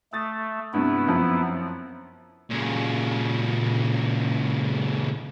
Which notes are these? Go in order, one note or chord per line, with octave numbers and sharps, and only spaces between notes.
A3 D#6 A6
G2 C3 B3 E4
F#2 F3 C4
A#2 C#3